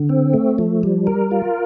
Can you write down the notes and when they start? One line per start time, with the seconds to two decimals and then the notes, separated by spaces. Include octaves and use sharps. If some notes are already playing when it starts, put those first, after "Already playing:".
Already playing: D3
0.09 C4
0.34 A3
0.58 F3
0.83 G3
1.07 A#4
1.31 F4